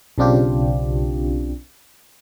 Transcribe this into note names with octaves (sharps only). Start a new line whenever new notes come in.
B1 C#3 C4 D4 F4 G4